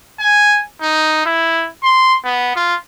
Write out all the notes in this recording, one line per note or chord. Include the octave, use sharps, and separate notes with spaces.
G#5
D#4
E4
C6
B3
F4